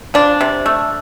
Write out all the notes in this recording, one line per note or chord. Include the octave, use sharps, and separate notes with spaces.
F3 D4
C3
A3